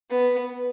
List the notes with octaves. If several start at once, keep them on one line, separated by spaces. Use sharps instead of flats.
B3